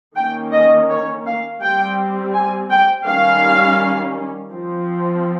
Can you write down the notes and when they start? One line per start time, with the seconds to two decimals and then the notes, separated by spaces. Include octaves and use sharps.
0.16 D#3 A#3 C#4 G5
0.53 D#5
0.89 C#5
1.26 F5
1.61 G3 C4 G5
2.34 G#5
2.70 G5
3.06 D#3 G3 C#4 F5
4.52 F3 C4